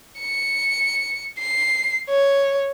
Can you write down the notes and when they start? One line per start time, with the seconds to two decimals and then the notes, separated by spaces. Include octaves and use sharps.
0.20 C#7
1.39 C7
2.10 C#5